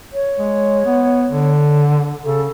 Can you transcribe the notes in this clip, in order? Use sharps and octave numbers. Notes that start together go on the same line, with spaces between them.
C#5
G#3
B3
D3
C#3 A4